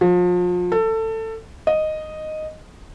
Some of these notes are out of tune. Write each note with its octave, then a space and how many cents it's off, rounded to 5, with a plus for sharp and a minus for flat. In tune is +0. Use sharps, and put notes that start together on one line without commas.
F3 +35
A4 +20
D#5 -5